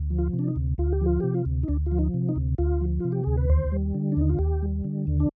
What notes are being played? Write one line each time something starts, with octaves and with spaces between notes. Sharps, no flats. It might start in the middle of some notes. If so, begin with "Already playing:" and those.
Already playing: D2
F3
F4
C3
D4
D#4
D2
D2 F4
G4
F3 F4
C3 G4
F4
D2
D#4
D2 D4
F4
F3
D#4
C3
D#4
D2
D2 F4
F3
C3 F4
G4
D2 G#4
B4
D#2 C5
G3
D3
D4
D#2 D#4
F4
D#2 G4
G3
D3
D#2
D4